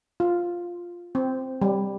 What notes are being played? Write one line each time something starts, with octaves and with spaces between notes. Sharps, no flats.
F4
C4
G3